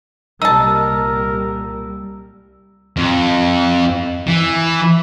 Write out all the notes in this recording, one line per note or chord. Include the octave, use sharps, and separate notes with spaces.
C2 A#2 G3 D#4 A#4 A5 E6
F2
E3